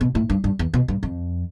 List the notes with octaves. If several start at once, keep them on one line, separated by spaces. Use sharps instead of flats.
B2
A2
G2
G2
E2
B2
G2
F2